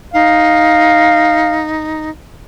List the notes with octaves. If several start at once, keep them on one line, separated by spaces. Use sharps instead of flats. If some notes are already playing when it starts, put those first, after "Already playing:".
D#4 F5